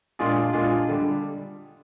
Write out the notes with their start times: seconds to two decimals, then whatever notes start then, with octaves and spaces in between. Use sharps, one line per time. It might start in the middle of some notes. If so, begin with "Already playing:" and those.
0.19 A#2 G#3 D4 F4 G#4
0.53 A#2 G#3 D4 F4 G#4
0.88 D3 G3